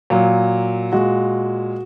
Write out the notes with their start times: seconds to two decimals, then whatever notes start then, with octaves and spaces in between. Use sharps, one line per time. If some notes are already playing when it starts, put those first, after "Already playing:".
0.10 A#2 F#3
0.92 A#2 G#3 F#4